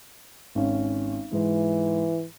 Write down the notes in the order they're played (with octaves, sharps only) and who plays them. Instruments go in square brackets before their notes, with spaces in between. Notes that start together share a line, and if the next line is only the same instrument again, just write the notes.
[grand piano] G#1 C#4
[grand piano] G#2 [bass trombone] E3